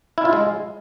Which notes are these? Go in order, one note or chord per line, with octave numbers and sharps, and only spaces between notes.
E4
F4
G#3